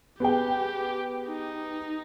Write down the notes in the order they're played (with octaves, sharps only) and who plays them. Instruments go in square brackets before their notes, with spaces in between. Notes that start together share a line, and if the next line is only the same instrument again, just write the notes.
[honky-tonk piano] B3 G#4 G5 [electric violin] G4
[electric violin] D#4